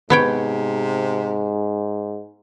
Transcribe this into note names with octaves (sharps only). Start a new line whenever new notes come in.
G#2 C3 B3 C#5 G5